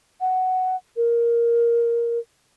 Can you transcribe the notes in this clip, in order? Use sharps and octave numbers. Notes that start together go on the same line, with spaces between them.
F#5
A#4